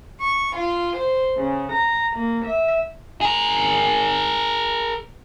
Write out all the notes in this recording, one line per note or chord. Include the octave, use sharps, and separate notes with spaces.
C#6
F4
C5
C#3
A#5
A#3
E5
G#4 A#4